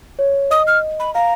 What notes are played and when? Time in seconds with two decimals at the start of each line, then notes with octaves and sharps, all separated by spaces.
0.19 C#5
0.51 D#5 D#6
0.67 F6
1.00 B5
1.14 F5 A#5